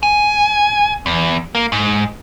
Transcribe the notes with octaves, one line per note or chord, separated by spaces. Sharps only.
G#5
E2
A#3
G#2